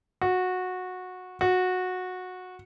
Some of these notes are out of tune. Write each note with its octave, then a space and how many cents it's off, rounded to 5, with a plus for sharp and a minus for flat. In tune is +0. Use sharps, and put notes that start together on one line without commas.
F#4 -15
F#4 -15